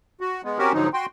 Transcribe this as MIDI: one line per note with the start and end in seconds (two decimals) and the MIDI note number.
0.21 0.42 66
0.44 0.58 56
0.44 0.58 59
0.58 0.72 60
0.58 0.72 61
0.58 0.72 66
0.58 0.72 67
0.58 0.72 70
0.73 0.89 44
0.73 0.89 50
0.73 0.89 53
0.73 0.89 54
0.73 0.89 63
0.93 1.06 66
0.93 1.06 79
0.93 1.06 84